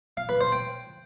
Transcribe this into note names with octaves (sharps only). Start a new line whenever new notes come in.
F5
B4
C5
G5